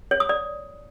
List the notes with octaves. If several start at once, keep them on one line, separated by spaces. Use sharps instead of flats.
C#5
D#6
D5